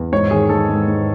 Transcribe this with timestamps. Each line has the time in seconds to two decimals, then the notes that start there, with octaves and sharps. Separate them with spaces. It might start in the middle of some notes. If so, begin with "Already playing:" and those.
Already playing: E2
0.12 G#2 C#5
0.31 D#3 G#4
0.49 G#2 A4
0.69 G#2
0.88 G#2